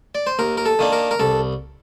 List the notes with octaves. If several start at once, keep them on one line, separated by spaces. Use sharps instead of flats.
D5
C5
D#2 A#4
A#4
A4
D#3 A#3 D4
A#4
A#4
C2 A4